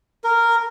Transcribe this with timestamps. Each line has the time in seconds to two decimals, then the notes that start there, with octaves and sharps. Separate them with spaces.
0.24 A#4